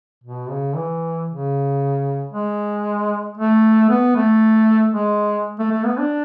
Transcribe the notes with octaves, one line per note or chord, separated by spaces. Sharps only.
B2
C#3
E3
C#3
G#3
A3
B3
A3
G#3
A3
A3
B3
D4